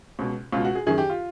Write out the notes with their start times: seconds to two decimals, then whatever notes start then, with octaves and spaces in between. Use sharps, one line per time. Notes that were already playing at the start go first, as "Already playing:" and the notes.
0.19 C#2 B2
0.52 C#2 B2 F4
0.64 F#4
0.75 G#4
0.87 F#2 D#3 G#4
0.98 G4
1.10 F4